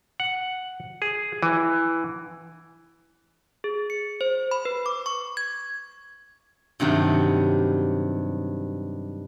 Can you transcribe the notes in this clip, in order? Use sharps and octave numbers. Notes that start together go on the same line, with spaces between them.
F#5
G#4
E3
G#4
C#7
C5
B5
B4
D6
C#6
G#6
G2 C3 D#3 F#3